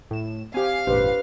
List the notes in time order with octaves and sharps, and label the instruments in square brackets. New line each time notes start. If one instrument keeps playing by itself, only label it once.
[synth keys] A2 E7
[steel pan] C4 G4 [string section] F5 [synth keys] G#5
[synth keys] G#1 F2 A#2 [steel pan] D4 G4 C5 [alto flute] B4